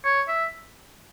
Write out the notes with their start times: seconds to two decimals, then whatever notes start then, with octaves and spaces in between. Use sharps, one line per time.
0.04 C#5
0.28 E5